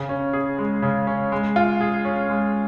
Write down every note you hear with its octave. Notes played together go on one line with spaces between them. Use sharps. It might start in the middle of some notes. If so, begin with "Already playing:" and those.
Already playing: C#3
C#4
G#4
G#3
C#3
C#4
G#3
F4
G#4
C#4
G#3